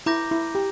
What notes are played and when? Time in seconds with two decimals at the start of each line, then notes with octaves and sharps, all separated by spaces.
0.06 E4 A#5 D6 G6 A#6
0.31 E4
0.55 G4